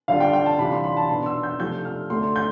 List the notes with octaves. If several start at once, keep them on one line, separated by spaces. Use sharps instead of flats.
D3 G3 D4 F4 F5
G5
G5
A5
C3 E3 G3 D4 F4 B5
C6
B5
A5
B2 B3 D4 C6
E6
G6
C3 F3 A3 D4 G6
F6
D2 D3 A3 C6
G6